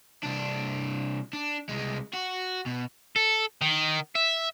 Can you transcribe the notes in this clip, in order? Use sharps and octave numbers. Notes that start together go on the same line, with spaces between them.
C2 D4
D4
C2 G#3
F#4
B2
A4
D#3
E5